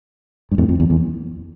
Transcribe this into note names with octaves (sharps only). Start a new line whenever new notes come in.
G2
F2 A2
F2
E2
E2